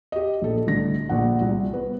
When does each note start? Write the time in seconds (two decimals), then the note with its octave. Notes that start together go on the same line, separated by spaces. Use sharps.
0.12 G4 D#5
0.42 A#1 A4
0.67 C2 A2 D3 A#6
1.09 A#1 F#5
1.41 C2
1.74 B3